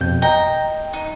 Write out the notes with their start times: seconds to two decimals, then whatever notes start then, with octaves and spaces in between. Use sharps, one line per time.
0.01 F2 B2 G6
0.22 D#5 G5 A#5
0.93 D#4